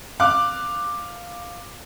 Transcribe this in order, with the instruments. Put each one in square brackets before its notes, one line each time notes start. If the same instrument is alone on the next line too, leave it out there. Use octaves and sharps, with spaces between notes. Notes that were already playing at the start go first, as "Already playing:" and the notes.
[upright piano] F5 D6 F#6